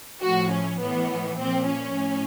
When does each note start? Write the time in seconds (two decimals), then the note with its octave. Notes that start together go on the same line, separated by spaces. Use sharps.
0.23 A2 F3 F#4
0.51 C#4
0.80 A2 E3 B3
1.39 A#2 F3 C4
1.67 C#4
1.97 A2